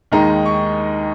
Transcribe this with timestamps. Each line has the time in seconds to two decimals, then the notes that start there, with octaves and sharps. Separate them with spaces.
0.12 D#2 D#3 G#3 D#4 A#5
0.46 C#6